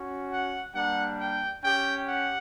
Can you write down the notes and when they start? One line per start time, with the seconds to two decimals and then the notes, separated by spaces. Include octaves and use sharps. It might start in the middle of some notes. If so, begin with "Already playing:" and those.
Already playing: C#4 F#4
0.32 F#5
0.75 G3 A#3 D4 F#5
1.19 G5
1.63 C#4 G4 G5
2.07 F#5